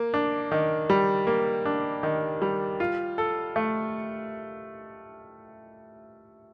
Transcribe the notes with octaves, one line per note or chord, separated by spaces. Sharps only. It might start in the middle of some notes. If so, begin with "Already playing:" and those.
Already playing: A#3
D4
D#3
G3
A#3
D4
D#3
G3
F4
A4
A3